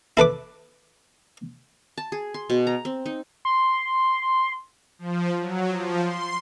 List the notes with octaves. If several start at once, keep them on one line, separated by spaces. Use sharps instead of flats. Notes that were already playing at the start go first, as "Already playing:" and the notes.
E4 A4 B4 D6
A5
G#4
C6
B2
A#5
C4
D#4
C6
F3
F#3
F3
C6